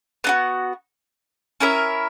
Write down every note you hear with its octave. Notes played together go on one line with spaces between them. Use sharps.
B3 D#4 F#4
C#4 E4 A#4 E5